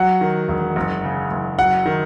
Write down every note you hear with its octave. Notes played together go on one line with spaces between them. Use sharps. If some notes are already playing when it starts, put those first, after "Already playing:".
Already playing: F#3 F#5
D#3
E1
F#1
C#3
F#1
F#3 F#5
D#3